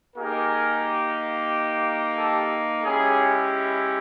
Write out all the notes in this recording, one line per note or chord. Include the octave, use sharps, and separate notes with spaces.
A#3 D#4 G4 G#4 A#4
G4 A4
G#3 C#4 E4 G4 G#4